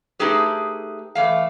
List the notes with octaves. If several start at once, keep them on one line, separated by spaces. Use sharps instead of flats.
A3 D#4 G4 G#4 B4
E3 A3 F5